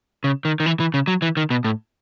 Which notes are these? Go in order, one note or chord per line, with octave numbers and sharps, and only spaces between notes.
C#3
D#3
D#3
E3
E3
C#3
F#3
E3
D#3
B2
A2